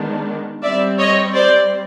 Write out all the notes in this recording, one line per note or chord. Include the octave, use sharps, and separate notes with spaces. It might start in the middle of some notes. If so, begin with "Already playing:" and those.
Already playing: D#3 G#3 B3 D4
G3 C4 D5 E5
C#5 D#5
C5 D5